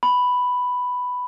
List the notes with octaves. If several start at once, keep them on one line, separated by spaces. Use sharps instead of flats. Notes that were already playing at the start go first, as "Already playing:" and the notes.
B5